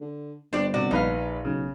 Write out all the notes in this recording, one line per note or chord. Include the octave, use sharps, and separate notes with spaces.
D3
G1 D4 G4 C5 D5
C3 F#4 D5
A#1 D#4 B4 F5
B1 C#3